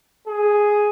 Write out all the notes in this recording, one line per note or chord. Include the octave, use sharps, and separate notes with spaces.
G#4